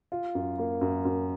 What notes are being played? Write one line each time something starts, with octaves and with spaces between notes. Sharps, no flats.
F4
F#2
A#3
F#2
F#2